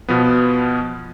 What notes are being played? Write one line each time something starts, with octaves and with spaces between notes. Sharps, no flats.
B2 F3 B3